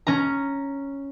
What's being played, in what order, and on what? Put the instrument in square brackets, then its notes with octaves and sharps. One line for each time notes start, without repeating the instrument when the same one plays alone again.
[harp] C#4 A#5